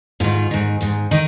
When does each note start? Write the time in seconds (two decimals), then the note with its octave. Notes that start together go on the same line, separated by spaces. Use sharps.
0.20 G#2 D#3 F4
0.51 G#2 D#3
0.81 G#2 D#3
1.11 D#3 D#4